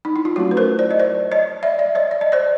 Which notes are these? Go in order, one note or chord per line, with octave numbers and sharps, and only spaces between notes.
D#4
E4
F4
F#3 A3 C#4 E4 F#4
B4
A#4 C5
C5 D5
D#5
C5 D5
C#5 D#5
D5 E5
D5 E5
C#5 D#5
D5
D#5
C5 D5